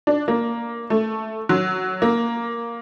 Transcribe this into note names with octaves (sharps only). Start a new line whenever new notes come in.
D4
A#3
A3
F#3
A#3